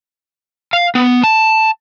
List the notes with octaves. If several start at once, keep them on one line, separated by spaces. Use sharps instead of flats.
F5
B3
A5